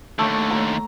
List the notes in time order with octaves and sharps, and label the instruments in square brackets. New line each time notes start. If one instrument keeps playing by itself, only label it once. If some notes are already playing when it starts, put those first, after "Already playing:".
[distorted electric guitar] D#2 D3 [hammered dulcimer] A3
[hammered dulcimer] A#5